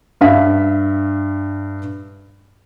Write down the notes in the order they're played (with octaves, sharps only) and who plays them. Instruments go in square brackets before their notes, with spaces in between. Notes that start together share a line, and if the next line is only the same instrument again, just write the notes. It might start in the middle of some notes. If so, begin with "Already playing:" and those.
[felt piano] G2 E5 F5 B6